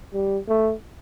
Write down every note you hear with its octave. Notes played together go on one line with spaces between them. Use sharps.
G3
A3